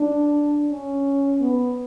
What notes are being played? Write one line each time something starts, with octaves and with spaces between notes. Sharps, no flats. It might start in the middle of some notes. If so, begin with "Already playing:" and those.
Already playing: D4
C#4
B3